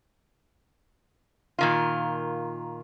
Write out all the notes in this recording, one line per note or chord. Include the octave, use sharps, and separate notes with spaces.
A#2 D#3 F4